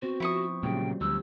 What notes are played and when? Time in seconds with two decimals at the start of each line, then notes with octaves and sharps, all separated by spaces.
0.02 B3 C4 F#4 C5
0.20 F3 E4 C#6 D#6
0.63 A#2 C#3 F#3 G3 G5
1.01 D2 G3 E6